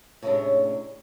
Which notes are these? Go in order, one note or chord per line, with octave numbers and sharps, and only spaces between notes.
A2 C3 G3 G#3 C#4 D4